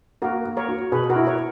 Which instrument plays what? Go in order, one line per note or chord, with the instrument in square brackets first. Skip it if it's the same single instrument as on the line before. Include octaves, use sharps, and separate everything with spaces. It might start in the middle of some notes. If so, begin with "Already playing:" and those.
[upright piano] A#3 [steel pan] F#4 A#4
[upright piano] A#3
[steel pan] A#4 C#5
[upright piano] F#4
[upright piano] B2 [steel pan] G#4 B4
[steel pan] F#4 A#4
[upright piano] E4
[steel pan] A#4 C#5